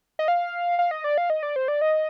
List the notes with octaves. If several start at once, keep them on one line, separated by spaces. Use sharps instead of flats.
D#5
F5
F5
D#5
D5
F5
D#5
D5
C5
D5
D#5